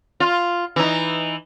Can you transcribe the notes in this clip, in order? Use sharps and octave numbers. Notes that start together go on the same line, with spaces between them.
F4
E3 D#4